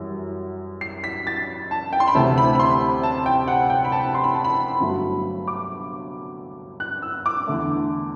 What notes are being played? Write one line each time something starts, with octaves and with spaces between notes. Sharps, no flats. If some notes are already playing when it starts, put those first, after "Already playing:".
Already playing: F#2 E3 G3
C7
B6
A6
A5
G5
C6
B5
D2 C3 E3 A3 A5
B5
B5
C6
A5
G5
F#5
G5
B5
A5
C6
B5
A5
B5
G1 G2 F#3 A3
D6
F#6
E6
D6
E2 D3 A3